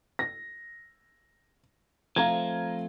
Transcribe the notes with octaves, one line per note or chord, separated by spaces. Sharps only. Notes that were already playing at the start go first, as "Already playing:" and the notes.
A#6
F3 A3 C4 F5 A#5 G#6